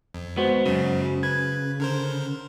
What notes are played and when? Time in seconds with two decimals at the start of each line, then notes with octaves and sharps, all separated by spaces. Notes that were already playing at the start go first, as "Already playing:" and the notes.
0.14 F2
0.37 G#3 B3 F#4 C5
0.66 F#2 C#3 F#3
1.23 B4 G#6
1.80 D3 A#4 C5